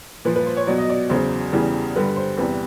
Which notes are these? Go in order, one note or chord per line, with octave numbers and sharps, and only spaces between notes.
A#2 F3 B4
B4
C5
C#5
B2 F#3 D5
D#5
D5
E2 C#3 F#3 C5
E2 C#3 E3 G3
G2 D3 G3 B4
C5
E2 C3 E3 G3 B4